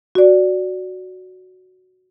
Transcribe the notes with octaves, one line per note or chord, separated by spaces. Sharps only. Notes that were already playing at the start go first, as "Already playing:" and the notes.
F#4 D5